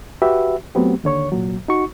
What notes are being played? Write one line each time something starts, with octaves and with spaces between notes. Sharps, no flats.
F#4 G4 B4 E5
F#3 A3 B3 C4 G4
D#2 D3 C#5 C#6
C2 A#2 F#3
D#4 F#4 C#6